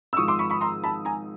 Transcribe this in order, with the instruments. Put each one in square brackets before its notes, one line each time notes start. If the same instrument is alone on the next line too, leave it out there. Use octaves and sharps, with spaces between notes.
[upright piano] E6
G#1 G#2 F3 C#6 D#6
C6 D6
B5 C#6
B5 C#6
A#5 C6
A5 B5
G#5 A#5